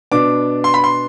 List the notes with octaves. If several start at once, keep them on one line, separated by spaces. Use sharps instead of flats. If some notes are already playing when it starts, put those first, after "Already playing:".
B2 B3 D4 D6
C6
B5
C6